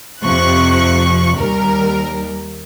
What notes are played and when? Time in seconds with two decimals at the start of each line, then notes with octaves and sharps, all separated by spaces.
0.23 F2 C3 F3 C#6 F#6
1.38 D#2 G3 A#4